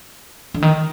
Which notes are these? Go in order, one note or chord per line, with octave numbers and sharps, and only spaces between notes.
D3
D#3